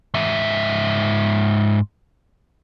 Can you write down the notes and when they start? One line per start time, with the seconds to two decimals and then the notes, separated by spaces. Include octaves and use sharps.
0.14 G#2 E5